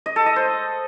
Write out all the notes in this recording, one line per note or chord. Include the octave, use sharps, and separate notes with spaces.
D#5
A4
D#5
C5